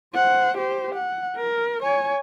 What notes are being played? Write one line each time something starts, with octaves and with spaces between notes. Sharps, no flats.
C5 F#5
G4 C5
F#5
A#4
C#5 G#5